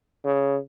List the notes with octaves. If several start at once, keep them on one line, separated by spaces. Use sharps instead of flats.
C#3